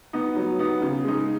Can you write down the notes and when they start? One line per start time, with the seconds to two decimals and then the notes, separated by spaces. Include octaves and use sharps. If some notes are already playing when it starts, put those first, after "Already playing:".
0.13 B3 D#4
0.36 F#3
0.59 B3 D#4
0.82 C#3
1.05 G#3 D#4